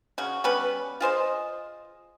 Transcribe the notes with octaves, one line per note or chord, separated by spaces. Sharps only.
C#3 F#4
G3 B3 C#4 B4
F4 G#4 C5 D#5